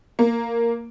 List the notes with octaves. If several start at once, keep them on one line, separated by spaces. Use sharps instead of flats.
A#3